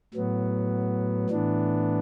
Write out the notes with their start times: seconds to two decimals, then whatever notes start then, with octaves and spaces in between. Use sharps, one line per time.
0.14 A2 F#3 B3
1.30 A2 E3 B3 D4